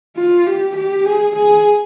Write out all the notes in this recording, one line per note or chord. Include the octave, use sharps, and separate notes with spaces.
F4
G4
G4
G#4
G#4